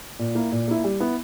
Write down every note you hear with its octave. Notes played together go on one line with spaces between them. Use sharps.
A#2
A#3 E4
A#2
A#3 E4
G3
B3 E4